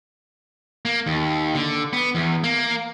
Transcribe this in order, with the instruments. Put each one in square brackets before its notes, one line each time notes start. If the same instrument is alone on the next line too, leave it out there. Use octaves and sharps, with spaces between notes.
[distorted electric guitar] A#3
D#2
D3
B3
E2
A#3